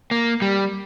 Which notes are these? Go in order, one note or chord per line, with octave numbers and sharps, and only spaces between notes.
A#3
G3